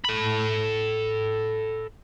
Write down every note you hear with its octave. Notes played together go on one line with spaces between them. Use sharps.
A4 B5